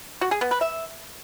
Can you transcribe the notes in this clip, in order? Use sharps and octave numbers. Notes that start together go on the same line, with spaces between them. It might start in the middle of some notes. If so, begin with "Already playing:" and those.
F#4
G#4
B3
B4
E5